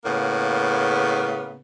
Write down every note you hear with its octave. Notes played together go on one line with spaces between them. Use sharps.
A2 C#3 A#3 B3